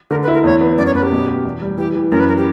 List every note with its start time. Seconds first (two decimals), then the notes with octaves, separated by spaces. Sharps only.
0.10 D3 A#4
0.22 B4
0.28 E4
0.33 A#4
0.44 E2 C#5
0.61 B3
0.78 F#2 D5
0.86 C#5
0.95 F#2 B4
1.02 G4
1.11 B2
1.27 G4
1.45 E2
1.62 G3
1.78 E3 G4
1.95 E3
2.11 F#2 A#4
2.20 B4
2.28 A#4
2.37 G4